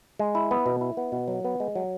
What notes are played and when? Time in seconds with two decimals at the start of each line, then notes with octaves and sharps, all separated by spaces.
0.19 G#3
0.35 E4
0.51 B3
0.66 B2
0.81 E4
0.97 B3
1.12 B2
1.28 F#3
1.44 B3
1.60 G#3
1.75 F#3